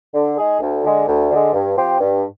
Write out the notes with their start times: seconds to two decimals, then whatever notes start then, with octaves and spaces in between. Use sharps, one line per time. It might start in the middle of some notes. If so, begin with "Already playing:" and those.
0.14 D3
0.37 G#3 D#4 G#4
0.60 D2
0.84 D3 G#3
1.07 D2
1.30 D3 G#3
1.53 G2
1.77 F3 C4 G4 C5
2.01 G2